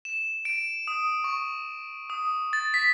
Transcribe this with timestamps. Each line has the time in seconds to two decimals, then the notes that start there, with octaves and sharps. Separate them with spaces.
0.05 E7
0.45 D7
0.88 D#6
1.24 C#6
2.10 D#6
2.53 A6
2.74 B6